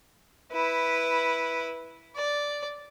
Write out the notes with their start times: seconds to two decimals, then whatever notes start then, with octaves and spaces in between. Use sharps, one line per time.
0.53 E4 B4
2.16 D5